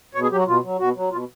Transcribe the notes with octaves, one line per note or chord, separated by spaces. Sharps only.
B2 C#5
G#4
F#3 G4
F#4
B2 F4
F#3
B2 F#4
F#3
B2 F4